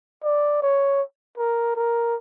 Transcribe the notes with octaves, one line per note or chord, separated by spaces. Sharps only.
D5
C#5
A#4
A#4